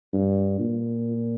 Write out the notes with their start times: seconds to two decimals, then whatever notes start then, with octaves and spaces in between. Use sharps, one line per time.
0.13 G2
0.60 A#2